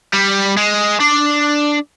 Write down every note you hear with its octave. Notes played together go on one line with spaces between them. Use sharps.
G3
G#3
D4